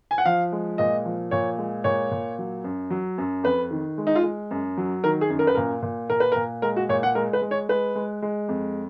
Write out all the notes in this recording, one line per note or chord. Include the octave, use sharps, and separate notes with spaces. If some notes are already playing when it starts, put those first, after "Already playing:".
G#5
F#5
F3 F5
G#3
A#2 D#5
F3
A#2 C#5
G#3
A#2 C#5
A#2
F#3
F#2
F#3
F#2
F2 B4
D#3
G#3
D#4
F4
G#3
F#2
F#3
D#3 A#4
G#4
F#2
A#4
B4
A#2 A#4
A#2
A#2 A#4
B4
A#2 A#4
G#3 A#4
F#4
A#2 C#5
F#5
G#3 A#4
B4
G#3
C#5
G#3 B4
G#3
G#3
F2